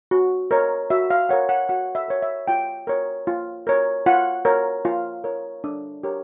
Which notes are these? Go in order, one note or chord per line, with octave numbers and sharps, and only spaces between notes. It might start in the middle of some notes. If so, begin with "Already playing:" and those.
F#4
A#4 C#5
F#4 E5
F5
A#4 C#5 F#5
F#5
F#4 F#5
E5
A#4 C#5
E5
F4 G5
A#4 C#5
F4
A#4 C#5
F4 F#5
A#4 C#5
F4 F5
A#4 C#5
D4
G4 A#4 C#5